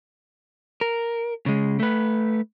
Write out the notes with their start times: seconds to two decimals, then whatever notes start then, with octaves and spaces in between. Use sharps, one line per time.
0.81 A#4
1.46 C#3 G#3
1.80 A3 B4